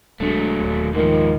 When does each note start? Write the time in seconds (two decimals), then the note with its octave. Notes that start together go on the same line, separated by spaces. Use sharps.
0.20 E1 F#3 G#3 A3 D4
0.63 D#1
0.95 G#2 D#3 F3